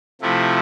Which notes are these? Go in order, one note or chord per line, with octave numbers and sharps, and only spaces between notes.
C3 F3 A3 E4